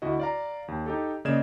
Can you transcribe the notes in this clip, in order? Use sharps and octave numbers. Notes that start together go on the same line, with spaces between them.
D2 E4 F#4 D#5
D5 F5 A#5
D#2
D#4 G4 A4
C#3 A#3 D5 D#5 G#6 E7